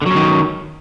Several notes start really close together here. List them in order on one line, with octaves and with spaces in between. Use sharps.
D3 F#3 C#4 D#3